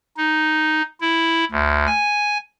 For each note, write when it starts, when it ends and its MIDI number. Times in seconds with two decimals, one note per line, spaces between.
0.17 0.82 63
1.01 1.45 64
1.51 1.86 38
1.87 2.38 80